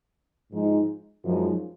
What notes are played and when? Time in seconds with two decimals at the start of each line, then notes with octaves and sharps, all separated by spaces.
0.52 G#2 F3 G#3 D#4
1.24 F#2 F3 G#3 D#4